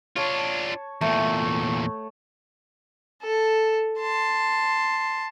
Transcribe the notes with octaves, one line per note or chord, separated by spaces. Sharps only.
D4 F4 C#5 A5
E2 A#2 A3
A4
A5 C6